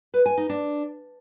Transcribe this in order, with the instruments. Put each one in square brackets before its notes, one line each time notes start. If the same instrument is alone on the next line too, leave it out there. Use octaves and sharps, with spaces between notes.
[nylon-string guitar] B4
G#5
D#4
D4